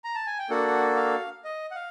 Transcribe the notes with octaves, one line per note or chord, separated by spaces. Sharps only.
A#5
A5
G#5
G5
A#3 D4 F#4 A4 F#5
F5
D#5
F#5
F5